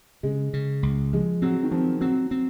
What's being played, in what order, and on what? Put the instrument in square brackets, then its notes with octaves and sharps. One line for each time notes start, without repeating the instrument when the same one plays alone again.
[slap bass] C#3 [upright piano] G#3
[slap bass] C#3
C#2
[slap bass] F3 [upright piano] G#3
[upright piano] F#3 [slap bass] C4
[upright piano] D#3
[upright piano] F3 [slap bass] C4
[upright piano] F#3 [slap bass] C4
[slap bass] C4